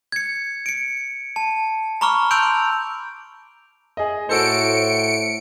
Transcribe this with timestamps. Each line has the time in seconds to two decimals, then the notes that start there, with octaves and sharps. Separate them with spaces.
0.12 G#6 C#7
0.66 C#7 D7
1.36 A5
2.01 A#5 B5 C#6 D6 F6
2.31 A5 C6 E6 G6 D7 F7
3.97 G#4 D#5
4.29 A2 F#4 A4 C5 C#7 D7